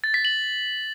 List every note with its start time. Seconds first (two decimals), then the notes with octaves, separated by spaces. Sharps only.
0.04 A6
0.14 B6
0.25 F#7